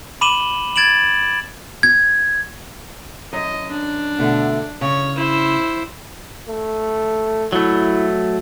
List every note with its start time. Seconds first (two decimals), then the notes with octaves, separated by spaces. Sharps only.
0.21 B5 D6 D#7 E7 F#7 G7
0.76 G#6 A6 D7 E7 F#7
1.83 G#6
3.33 F#2 D#5
3.71 D4
4.18 B2 D3 A3
4.81 C#3 C#5
5.16 E4 C5
6.48 A3
7.53 F#3 A3 E4